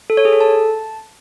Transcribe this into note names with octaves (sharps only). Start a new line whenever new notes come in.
A4
C#5
G#4
A4
A5